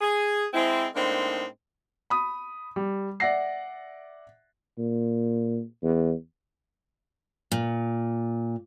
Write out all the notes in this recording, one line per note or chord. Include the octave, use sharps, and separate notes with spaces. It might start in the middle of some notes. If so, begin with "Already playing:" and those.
G#4
G#3 C4 E4
A2 G#3 A#3 C4 D4 D#4
B5 D#6
G3
D5 E5 F#5 A#6 C7
A#2
E2
A#2